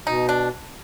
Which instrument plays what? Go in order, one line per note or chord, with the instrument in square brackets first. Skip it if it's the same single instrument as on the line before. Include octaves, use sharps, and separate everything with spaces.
[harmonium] B2 [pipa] D#4
[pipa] D4